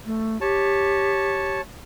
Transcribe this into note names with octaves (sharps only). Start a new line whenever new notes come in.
A3
G4 C#5 A5